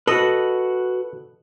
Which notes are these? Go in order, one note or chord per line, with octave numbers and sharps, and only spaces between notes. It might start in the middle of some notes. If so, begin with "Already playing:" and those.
F#4 A4 B4 D#5